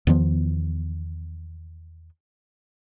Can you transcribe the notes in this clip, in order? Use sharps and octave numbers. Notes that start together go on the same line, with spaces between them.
E2 D#3 F3 B3